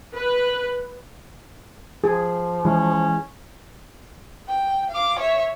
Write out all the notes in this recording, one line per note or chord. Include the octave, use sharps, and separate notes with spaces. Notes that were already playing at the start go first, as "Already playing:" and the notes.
B4
F3 G#4
E3 G#3 C#4
G5
F5 D6
C#5 E5